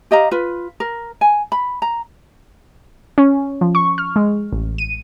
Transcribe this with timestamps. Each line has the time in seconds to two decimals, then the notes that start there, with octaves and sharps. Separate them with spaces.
0.11 G4 D#5 F5 A#5
0.31 F4 B4
0.80 A#4
1.21 G#5
1.52 B5
1.82 A#5
3.18 C#4
3.61 F3
3.75 C#6
3.98 F6
4.16 G#3
4.53 A1
4.78 D#7